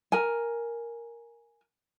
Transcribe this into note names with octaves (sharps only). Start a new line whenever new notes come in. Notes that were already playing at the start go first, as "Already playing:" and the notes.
A#4 G#5